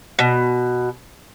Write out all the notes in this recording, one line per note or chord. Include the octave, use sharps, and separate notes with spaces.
B2